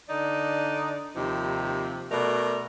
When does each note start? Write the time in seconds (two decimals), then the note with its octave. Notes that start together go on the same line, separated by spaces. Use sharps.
0.09 D3 D#4 D5
1.16 D#2 C3 F3 D#4
2.11 B2 A3 A#4 D5